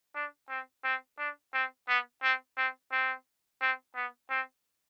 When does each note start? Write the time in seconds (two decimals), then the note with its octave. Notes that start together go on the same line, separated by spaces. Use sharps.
0.15 D4
0.49 C4
0.84 C4
1.18 D4
1.53 C4
1.89 B3
2.23 C4
2.57 C4
2.92 C4
3.61 C4
3.95 B3
4.30 C4